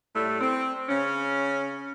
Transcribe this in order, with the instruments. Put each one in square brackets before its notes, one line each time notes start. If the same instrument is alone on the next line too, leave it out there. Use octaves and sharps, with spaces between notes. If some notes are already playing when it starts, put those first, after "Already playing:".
[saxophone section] A2 G3 A3
C4
C#3 C#4